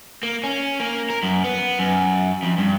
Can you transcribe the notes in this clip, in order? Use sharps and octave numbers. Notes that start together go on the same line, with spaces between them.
A#3
C#4
A#3
A#4
F#2
B3
F#2
F2
G2